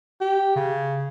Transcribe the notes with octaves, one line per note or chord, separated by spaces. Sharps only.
G4
C#3